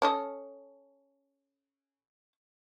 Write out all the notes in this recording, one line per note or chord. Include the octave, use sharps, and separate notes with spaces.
C#4 A4 D#5